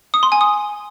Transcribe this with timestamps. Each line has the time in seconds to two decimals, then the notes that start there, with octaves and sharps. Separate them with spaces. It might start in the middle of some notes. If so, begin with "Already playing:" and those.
0.14 D#6
0.23 C6
0.32 G#5
0.41 D#6